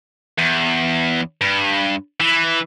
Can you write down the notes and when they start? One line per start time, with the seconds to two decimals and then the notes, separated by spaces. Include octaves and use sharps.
0.38 E2
1.41 G2
2.20 E3